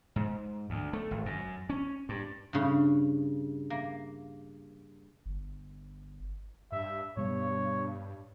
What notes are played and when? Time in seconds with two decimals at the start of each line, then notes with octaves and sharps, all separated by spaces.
0.16 G#2
0.70 D2
0.93 A3
1.11 G#1
1.26 F#2
1.70 C#4
2.09 G2
2.53 G2 C#3
3.70 A#3
5.26 G1
6.72 G2 E5
7.17 G2 B2 G3 B3 C#5